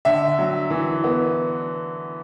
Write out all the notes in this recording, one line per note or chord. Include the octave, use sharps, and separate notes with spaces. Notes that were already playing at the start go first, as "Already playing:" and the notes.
D3 E5
F#3
E3
B3